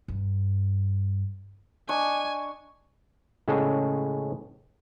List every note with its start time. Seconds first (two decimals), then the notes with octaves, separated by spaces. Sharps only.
0.08 G2
1.89 D4 D#5 G#5 C#6
3.48 A2 C#3 G#3 C#4 G#4 A4